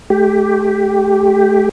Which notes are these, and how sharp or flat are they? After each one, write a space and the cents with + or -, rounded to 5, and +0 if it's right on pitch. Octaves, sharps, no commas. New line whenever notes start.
A3 -40 G4 +0